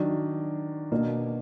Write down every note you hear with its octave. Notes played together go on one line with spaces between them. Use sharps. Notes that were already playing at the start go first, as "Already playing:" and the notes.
Already playing: D#3 F#3 D4
B2 A#3 D4